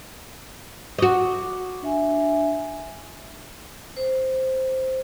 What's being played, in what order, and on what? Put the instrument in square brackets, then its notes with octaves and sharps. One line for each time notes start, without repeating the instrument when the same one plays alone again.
[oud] F#4 D#5 [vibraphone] C#6 D6
[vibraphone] D4 E5 G#5
C5